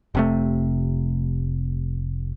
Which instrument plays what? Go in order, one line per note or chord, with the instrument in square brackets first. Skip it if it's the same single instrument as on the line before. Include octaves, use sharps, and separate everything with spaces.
[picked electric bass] F1 C3 A3